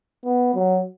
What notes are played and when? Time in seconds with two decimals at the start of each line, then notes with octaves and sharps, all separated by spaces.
0.25 B3
0.55 F#3